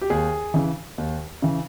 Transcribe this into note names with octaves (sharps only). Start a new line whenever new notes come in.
G4
D#2 G#4
C#3 E3
D#2
C#3 E3